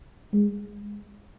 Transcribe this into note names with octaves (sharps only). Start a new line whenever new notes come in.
G#3